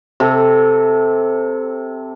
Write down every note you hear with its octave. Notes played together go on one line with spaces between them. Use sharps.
C3 A4